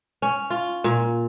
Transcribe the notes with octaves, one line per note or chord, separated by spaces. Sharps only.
C#4
F4
A#2